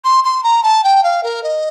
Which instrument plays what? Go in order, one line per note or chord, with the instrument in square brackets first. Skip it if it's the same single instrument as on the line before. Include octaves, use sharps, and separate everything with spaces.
[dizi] C6
C6
A#5
A5
G5
F5
A#4
D#5